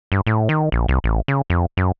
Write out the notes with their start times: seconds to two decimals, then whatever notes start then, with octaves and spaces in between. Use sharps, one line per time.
0.12 G2
0.27 A2
0.49 D#3
0.72 A#1
0.88 C2
1.04 A1
1.28 C#3
1.50 F2
1.77 F#2